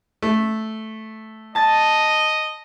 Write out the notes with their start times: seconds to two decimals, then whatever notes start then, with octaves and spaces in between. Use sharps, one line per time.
0.22 A3
1.55 D#5 A5 A6